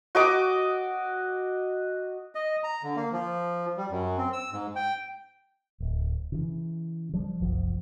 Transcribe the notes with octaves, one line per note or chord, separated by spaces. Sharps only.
F#4 D#5 D6
D#5
A#5
D3
A#3
F3
G3
F#2
C4
E6
G#2
G5
D1
C#3 E3
F3 G3
F#1 C2 F3